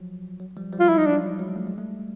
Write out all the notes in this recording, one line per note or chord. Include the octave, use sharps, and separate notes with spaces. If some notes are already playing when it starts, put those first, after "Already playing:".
Already playing: F3 F#3
F#3
F3 G3
F3 G3
F4
F#3 E4
D#4
F#3 D4
F#3
F#3 G#3
A3
G#3
G3 A3